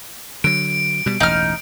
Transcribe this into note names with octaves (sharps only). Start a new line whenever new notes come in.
D3 F#3 D7
B2 G3
E1 A1 D#4 F6